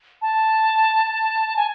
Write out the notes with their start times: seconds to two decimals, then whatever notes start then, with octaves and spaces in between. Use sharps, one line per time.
0.22 A5
1.56 G#5